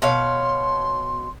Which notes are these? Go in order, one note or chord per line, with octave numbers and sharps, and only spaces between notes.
B2 C#5 F5 C6